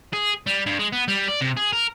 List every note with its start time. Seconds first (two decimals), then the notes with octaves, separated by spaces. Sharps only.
0.13 G#4
0.46 G3
0.66 G2
0.79 G#3
0.92 B3
1.08 G3
1.28 D5
1.41 C3
1.57 G#4
1.72 A#4